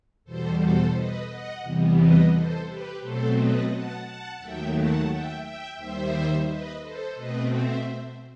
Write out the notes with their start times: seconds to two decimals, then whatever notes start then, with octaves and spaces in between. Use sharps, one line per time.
0.24 E2 B2 G3 A4 C5
0.59 A4 C5
0.94 B4 D#5
1.28 D#5 F#5
1.63 E2 C3 E3 G3 B3
1.97 B4 D#5
2.32 A4 C5
2.66 G4 B4
3.01 B2 F#3 A3 C4 A4 C5
3.35 B4 D#5
3.70 F#5 A5
4.04 F#5 A5
4.39 D#2 D#3 F#3 A3 E5 G5
4.73 F#5 A5
5.08 E5 G5
5.42 E5 G5
5.76 D#2 D#3 G3 C5 E5
6.46 B4 D#5
6.81 A4 C5
7.15 B2 A3 C4 B4 D#5
7.50 C5 E5